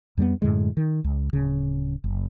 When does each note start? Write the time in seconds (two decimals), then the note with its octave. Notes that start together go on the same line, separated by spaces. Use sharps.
0.17 F2 G3 A3 B3
0.42 F#2 A2 D3 G#3
0.77 D#3
1.04 C#2
1.33 D1 C#3
2.04 F#1